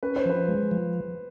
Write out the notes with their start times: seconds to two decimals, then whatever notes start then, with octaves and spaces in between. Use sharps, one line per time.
0.03 C#4 B4
0.16 C5
0.26 F3 B4
0.48 G#3
0.71 F3